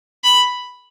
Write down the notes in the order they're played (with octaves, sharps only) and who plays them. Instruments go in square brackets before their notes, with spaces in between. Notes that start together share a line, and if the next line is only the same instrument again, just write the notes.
[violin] B5